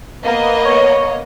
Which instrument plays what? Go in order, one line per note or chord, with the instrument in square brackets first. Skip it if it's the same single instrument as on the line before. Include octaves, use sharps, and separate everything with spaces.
[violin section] A#3 B3 D#5
[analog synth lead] C#5